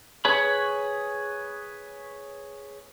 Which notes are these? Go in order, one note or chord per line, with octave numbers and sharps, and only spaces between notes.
G#4 B4 C#5 B5